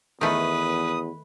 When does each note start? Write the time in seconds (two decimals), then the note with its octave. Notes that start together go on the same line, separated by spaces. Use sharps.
0.21 E2 D#3 A3 B4 D#6